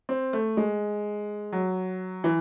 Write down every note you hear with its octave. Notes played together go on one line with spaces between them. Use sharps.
C4
A3
G#3
F#3
E3